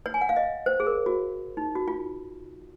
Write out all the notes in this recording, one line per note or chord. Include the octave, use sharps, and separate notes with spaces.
C#5
G#5
F#5
F5
D#5
C5
G#4
A#4
F#4
D#4
F#4
F4